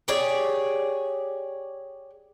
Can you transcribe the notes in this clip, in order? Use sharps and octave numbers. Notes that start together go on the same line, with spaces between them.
G4 G#4 C#5 D5